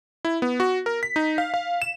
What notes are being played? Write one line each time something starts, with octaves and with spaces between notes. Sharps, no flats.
E4
B3
F#4
A#4
B6
D#4
F5
F5
E7